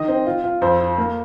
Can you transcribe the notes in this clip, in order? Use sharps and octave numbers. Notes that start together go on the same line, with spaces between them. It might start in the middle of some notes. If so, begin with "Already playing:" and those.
Already playing: D#3 D#5
C4
F4
F4
F2 C5
F4
A#3